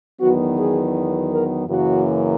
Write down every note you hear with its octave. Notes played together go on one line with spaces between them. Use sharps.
E2 D#3 F#3 B3 F#4
G#4
A#4
F#2 C#3 E3 A#3 C#4 F#4